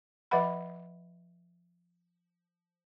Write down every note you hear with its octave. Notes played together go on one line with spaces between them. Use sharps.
F3 B4 E5 F#5 B5